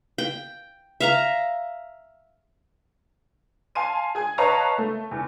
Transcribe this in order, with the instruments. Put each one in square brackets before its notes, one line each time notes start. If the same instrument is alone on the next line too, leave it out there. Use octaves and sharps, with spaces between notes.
[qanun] G5
E5 F5 A#5
[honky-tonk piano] F5 G#5 A5 C6 D#7
G#4 G#5
B4 C#5 D#5 F5 A5 A#5
A3
E2